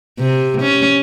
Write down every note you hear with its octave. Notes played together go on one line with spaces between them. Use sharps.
C3
C#4